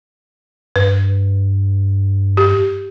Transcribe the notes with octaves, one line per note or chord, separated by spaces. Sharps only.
G2 B4
G4